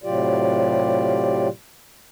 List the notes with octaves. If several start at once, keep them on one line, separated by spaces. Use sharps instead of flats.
A2 C3 F#3 F4 G4 D5